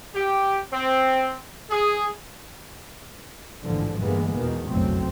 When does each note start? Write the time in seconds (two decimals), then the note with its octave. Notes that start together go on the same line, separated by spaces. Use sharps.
0.15 G4
0.73 C4
1.70 G#4
3.64 A1 E2 G#2 D3 F3
4.01 G2 D3 E3 G#3 A#3 B3
4.37 E2 B2 D#3
4.69 F#1 B1 F2 F#3 A3 C4